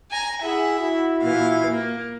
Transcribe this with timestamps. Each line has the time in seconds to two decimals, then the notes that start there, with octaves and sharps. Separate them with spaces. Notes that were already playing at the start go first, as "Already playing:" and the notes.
0.11 G#5 A#5
0.42 E4 G#4 E5 F#5
0.80 E4 F#4
1.22 A#2 E3 F5
1.68 A#3